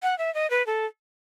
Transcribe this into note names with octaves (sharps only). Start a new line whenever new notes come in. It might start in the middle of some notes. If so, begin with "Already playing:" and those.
F#5
E5
D#5
B4
A4